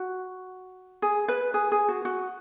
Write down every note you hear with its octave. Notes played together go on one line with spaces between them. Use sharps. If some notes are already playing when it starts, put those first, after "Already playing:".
Already playing: F#4
G#4
B4
G#4
G#4
F#4
F#4